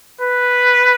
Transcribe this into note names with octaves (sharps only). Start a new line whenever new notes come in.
B4